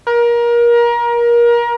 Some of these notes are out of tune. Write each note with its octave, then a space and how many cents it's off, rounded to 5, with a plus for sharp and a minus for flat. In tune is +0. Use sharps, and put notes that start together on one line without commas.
A#4 +25